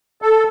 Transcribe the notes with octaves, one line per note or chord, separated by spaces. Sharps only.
A4